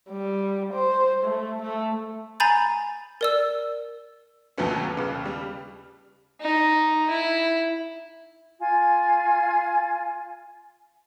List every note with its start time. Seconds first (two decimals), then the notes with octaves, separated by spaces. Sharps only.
0.10 G3
0.74 C5
1.25 A3
1.62 A3
2.40 G#5 A#5 B5 G6 A6
3.21 A#4 D5 E6
4.58 D#2 F#3 A3 B3 C#4
4.97 D#2 C#3 B3
5.26 G3
6.41 D#4
7.10 E4
8.59 F4 G#5